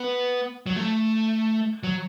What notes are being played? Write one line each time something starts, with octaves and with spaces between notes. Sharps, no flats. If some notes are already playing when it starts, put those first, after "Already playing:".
Already playing: B3
F#3
A3
F#3